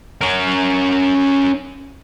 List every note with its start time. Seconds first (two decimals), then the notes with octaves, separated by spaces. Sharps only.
0.21 C#4 A#4